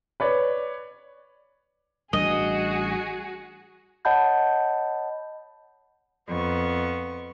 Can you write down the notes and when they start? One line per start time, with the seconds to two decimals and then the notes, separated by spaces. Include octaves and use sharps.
0.20 B4 C#5 D5
2.13 A1 G3 D4 F#4 G#4 D#5
4.05 C#5 D#5 F#5 A5 B5 G6
6.28 F2 B3 C#6